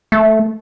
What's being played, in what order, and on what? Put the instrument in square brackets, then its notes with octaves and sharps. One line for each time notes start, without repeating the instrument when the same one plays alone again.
[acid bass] A3